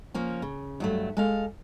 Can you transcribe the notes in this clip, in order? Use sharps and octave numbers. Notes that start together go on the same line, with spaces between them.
F3 A#3 C#4
C#3
G2 F#3 A3
G#3 A4 F5